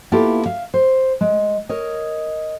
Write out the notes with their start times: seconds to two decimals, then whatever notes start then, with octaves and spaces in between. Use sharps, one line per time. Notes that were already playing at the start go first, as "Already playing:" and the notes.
0.12 A#3 B3 E4 F4 G4 A4
0.46 E5 F5
0.74 C5
1.21 G#3
1.69 A#4 C#5 D#5